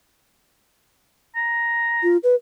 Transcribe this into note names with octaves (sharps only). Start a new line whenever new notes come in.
A#5
F4
B4